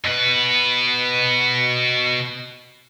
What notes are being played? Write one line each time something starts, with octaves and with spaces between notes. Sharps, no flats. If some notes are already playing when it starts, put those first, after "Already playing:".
B2 B4